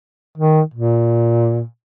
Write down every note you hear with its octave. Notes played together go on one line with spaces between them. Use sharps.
D#3
A#2